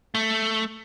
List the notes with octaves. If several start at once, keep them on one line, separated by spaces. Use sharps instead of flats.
A3